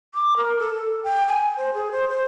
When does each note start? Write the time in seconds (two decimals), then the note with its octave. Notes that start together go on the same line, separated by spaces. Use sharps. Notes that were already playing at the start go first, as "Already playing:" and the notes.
0.14 D6
0.37 A#4
0.59 A4
0.76 A4
1.03 G5
1.28 G#5
1.57 C5
1.74 G#4
1.91 C5
2.09 C5